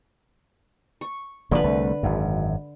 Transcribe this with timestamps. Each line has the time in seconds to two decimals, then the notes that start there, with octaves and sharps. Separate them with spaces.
1.01 C#6
1.51 F1 D3 F3 A#3 B4
1.63 C2 A3
2.03 G#1 F#2